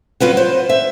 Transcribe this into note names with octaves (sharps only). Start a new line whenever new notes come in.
F#3 F4 B4 F#5
C5
E5